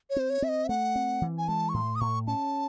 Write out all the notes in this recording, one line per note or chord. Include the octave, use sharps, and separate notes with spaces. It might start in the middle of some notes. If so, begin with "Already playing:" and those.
C#5
C4 C5
C#5
C4 E5
D#5
E5
A3 F#5
C4
E3
G#5
G#3 A5
C#6
A2 C6
D#6
A2 C#6
C#4 A5